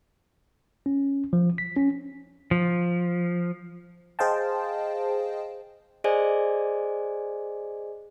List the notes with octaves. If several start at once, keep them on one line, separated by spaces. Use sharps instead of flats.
C#4
F3
B6
C#4
F3
G#4 C5 D#5 F5 G5 A5
G#4 C5 D5 D#5 G#5